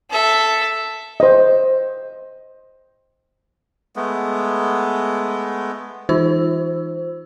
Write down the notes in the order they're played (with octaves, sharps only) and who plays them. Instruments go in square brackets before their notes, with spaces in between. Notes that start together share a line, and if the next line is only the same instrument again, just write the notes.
[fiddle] A4 E5
[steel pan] C5 D#5
[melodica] G#3 A3 B3
[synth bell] E3 D#4 F4 C5 E6